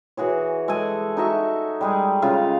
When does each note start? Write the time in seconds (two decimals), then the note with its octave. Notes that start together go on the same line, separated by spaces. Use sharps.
0.17 E3 F#4 G#4 C#5
0.68 G#3 A4 F#5 G#5
1.17 D#4 F#4 E5 C#6
1.81 G3 G#3 G#4
2.22 C#3 F4 F5